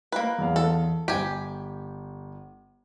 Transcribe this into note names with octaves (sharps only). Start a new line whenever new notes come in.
A#3 B4
E2 F5
A4
G1 G4 G#5